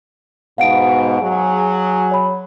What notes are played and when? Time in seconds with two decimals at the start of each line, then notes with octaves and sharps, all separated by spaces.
0.58 G#2 B2 F5 F#5 D7
1.20 F#3 G#4
2.12 C#5 B5